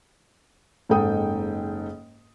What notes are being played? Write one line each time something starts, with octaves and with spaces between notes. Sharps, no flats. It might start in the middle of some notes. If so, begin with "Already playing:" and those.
F#1 G#2 D#4 A4 G5 D#6